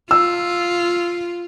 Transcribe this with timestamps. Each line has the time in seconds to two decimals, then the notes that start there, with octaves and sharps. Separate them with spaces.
0.11 F4 E6